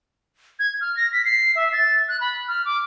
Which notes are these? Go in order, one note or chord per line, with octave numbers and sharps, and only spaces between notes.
G#6
F6
A#6
B6
C7
E5
A6
F#6
B5
F6
D6